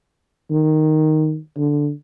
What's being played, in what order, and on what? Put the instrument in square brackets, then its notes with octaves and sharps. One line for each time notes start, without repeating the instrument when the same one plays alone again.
[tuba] D#3
D3